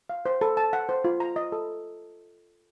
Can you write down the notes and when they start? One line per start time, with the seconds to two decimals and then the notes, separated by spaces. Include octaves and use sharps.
0.10 F5
0.26 C5
0.41 A4
0.57 A5
0.73 F#5
0.89 C5
1.04 F4
1.20 A#5
1.36 D#5
1.52 A4